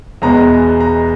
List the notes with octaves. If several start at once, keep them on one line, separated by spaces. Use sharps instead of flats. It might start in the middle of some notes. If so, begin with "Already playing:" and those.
E2 B2 G#3 B3 A#5
A#5